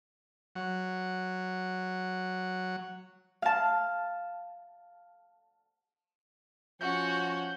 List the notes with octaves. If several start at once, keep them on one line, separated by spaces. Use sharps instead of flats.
F#3 F#5
F5 A5
F3 C#4 F#4 F#5 G6